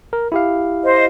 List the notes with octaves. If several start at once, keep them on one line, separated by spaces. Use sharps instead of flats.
A#4
E4 G4 F5
C5 D#5